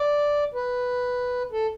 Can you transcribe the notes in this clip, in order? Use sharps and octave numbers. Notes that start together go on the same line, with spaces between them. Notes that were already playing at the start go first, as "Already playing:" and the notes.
Already playing: D5
B4
A4